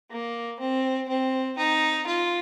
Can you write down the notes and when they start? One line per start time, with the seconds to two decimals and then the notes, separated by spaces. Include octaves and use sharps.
0.11 A#3
0.59 C4
1.09 C4
1.58 D#4
2.07 F4